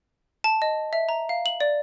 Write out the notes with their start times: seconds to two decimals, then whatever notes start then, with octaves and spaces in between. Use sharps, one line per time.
0.44 A5
0.62 D#5
0.93 E5
1.09 A#5
1.29 F5
1.46 F#7
1.61 D5